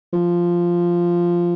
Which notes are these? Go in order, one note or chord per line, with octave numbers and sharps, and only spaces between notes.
F3